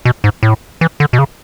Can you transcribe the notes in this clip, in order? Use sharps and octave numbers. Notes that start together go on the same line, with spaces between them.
B2
G#2
A2
E3
D3
B2
C#3